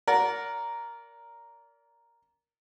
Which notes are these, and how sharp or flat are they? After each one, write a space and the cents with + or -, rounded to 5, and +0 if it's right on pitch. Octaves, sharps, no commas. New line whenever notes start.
A#4 +0 D5 -30 F#5 -10